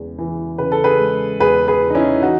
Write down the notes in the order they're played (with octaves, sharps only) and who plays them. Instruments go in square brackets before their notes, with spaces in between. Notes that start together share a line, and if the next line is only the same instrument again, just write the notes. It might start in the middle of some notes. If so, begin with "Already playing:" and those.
Already playing: [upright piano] E2 C#3 G#3
E3
C#3 B4
A4
G#4 B4
G#3
E2 G#4 B4
G#4 B4
E3
D#4
C#4 E4
E3 D#4 F#4